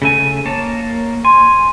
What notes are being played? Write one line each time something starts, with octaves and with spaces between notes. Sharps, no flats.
C#3 A3 G#5
A#3 C#5 A5
G#5 C6